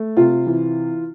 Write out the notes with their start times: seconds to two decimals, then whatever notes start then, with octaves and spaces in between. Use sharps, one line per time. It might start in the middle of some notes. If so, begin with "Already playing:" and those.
Already playing: A3
0.17 C3 F4
0.46 E3